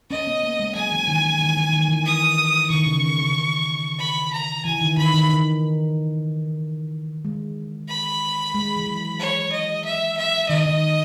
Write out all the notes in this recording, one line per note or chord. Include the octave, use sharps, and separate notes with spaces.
C#4 D#5
B3
A#3
G#3
F#3 G#5
E3
D#3
E3
D#3
D#3
D#3
E3
D#6
D#3 C#6
C#3
D#3
C#3
C#3
D#3
B5
A#5
E3 G#5
D#3
D#3 B5
D#3
D#3
G#3
B5
G#3
E3
F#3
C#5
D#5
E5
E5
D#3 D#5
D#3